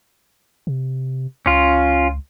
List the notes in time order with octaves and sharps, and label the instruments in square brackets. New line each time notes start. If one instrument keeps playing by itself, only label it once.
[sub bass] C3
[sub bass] C#2 [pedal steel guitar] C#4 F4